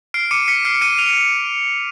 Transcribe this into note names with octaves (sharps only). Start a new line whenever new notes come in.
F6 C7 D7
D6 C#7 D#7
F6 B6 C#7
F6 C7 D7
F6 C#7 D#7
F6 D#7 F7